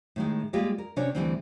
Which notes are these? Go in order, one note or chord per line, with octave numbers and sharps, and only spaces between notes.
A2 D#3 G#3
G3 G#3 A#3 F4 G4
A#4
C3 C#4 D4 C#5
D2 A2 C3 E3 G3 C4